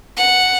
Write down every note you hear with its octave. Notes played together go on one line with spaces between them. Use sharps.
F#5